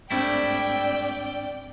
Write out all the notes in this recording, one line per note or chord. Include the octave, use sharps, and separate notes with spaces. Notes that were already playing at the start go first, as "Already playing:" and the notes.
G#2 G3 A3 C4 D4 E4 D5 G5